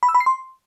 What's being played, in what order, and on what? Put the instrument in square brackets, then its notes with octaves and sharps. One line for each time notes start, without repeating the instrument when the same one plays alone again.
[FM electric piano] B5
E6
B5
C7
C6